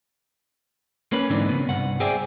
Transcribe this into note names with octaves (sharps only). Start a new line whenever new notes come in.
A#3 C#4 B4
G#2 D3 E3 C4 D4 D#4
C#3 B3
C2 G2 F#5
G#4 C5 D5 E5 G5 G#5